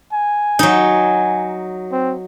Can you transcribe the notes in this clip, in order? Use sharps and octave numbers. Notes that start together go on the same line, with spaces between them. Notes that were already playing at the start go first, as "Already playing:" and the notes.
G#5
F#3 D#4
C4